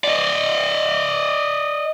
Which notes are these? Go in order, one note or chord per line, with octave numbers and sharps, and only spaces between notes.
D5 D#5